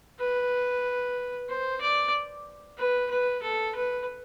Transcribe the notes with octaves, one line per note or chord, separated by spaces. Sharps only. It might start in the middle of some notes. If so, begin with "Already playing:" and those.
B4
C5
D5
B4
B4
A4
B4